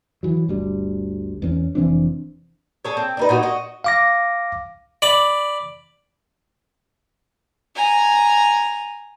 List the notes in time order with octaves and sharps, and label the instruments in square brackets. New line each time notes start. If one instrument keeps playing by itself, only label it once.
[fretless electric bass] E3 F#3
G1 D2 G3
E2 B3 C#4
F1 E3 C4 D4
[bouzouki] G#4 A4 C#5
C4
D4 D#4 B4
A#2 D#4 F#4 D#5
F#4 D#5
[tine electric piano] F5 D6 A#6
[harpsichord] D5 B5 D6
[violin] G#5 A#5